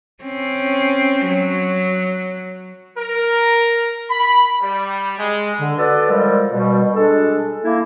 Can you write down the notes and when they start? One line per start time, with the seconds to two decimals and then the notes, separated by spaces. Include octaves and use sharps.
0.24 C4 C#4
1.28 F#3
2.98 A#4
4.10 B5
4.62 G3
5.18 G#3
5.60 D3
5.78 F#4 A4 B4 D5
6.10 F3 G3 G#3 A#4
6.52 B2 G3
6.95 G#3 D4 A4
7.64 A3 A#3 E4